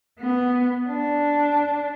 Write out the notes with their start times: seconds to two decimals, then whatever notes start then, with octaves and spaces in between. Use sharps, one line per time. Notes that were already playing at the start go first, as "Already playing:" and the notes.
0.20 B3
0.89 D4